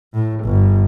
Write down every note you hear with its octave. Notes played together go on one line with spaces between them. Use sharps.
A2
G1